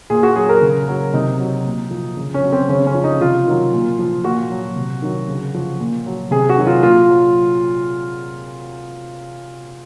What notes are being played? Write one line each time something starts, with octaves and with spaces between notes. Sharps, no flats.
A#2 G#4
F#4
F#3 G#4
A#4
C#3
F#3
C3 D#4
F#3
A#2
F3
C#3
C#4
F#3
C4
C#3 C#4
C#4
F3
D#4
C3 F4
D#3 F#3
A#2
F3
A#2 F#4
F#3
C3
D#3 F#3
C#3
F3
A#2
F#3
C3 G#4
F#4
D#3 F#3
F4
A#2 F4
F#3